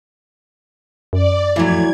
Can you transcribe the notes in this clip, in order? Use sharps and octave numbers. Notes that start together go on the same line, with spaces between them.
F#2 D5
F2 A2 E3 F#3 G#6